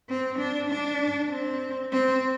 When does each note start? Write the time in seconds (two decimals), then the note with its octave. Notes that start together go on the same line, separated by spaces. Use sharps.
0.09 C4
0.39 D4
0.69 D4
1.30 C4
1.92 C4